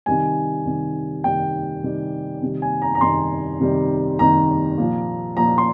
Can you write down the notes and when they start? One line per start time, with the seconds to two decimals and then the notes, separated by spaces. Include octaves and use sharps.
0.06 C3 D#3 G3 G#5
0.65 C3 D#3 G3
1.24 C3 D#3 G3 G5
1.83 C3 D#3 G3
2.42 C3 D#3 G3
2.62 G#5
2.82 A#5
2.95 A#5
3.01 C3 D#3 G3 C6
3.60 C3 D#3 G3
4.19 C3 D#3 G3 A#5
4.78 A#2 F3
5.37 A#2 F3 A#5
5.58 C6